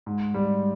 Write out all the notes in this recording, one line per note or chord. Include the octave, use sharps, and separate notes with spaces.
G#2
G3